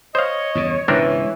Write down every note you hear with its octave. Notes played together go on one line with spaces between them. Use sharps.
C5 C#5 D#5 F5
E2 G2 C#3
C#2 G#2 B2 E3 C4 D4 A#4